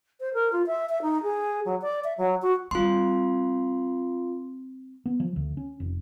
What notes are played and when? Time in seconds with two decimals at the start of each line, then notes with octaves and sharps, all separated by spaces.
0.20 C5
0.34 A#4
0.52 F4
0.67 E5
0.89 E5
1.02 D#4
1.23 G#4
1.65 F#3
1.82 D5
2.04 E5
2.18 F#3
2.42 F#4
2.71 G3 C4 F4 C6
5.06 B3
5.20 F3
5.36 D2
5.57 C#4
5.80 F1